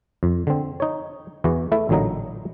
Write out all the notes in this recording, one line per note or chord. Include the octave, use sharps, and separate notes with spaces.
F2
D3 C4
D#4 C#5
E2 E3 F#4
A3 E4
A1 A#2 D3 F#3 D#4 A#5